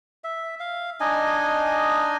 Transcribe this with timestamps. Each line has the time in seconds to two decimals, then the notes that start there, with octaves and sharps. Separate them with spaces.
0.24 E5
0.60 F5
1.00 D4 D#4 D#5 G#5